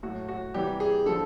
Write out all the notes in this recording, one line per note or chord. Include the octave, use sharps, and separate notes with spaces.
A2 F#3 F#4
F#4
C3 E3 G3 G4
G#4
D3 F3 A4